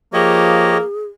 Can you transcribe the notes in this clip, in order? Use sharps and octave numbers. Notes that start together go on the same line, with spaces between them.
F3 A#3 G4 G#4 C#5 D#5